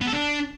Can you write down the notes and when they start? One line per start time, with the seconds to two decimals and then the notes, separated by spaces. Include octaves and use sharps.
0.01 B3
0.07 A4
0.13 D4